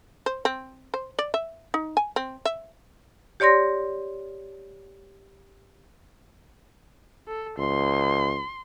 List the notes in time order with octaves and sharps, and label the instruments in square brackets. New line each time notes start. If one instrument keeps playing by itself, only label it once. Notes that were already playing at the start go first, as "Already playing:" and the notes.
[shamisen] C5
C4
C5
D5
E5
D#4
G#5
C4
E5
[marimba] G4 C#5 D5 C6 A#6
[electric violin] A4
[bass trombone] C#2 [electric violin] C6